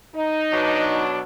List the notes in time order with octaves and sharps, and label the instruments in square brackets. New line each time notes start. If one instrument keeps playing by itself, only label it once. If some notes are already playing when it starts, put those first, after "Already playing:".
[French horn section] D#4
[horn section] B2 F#3 D4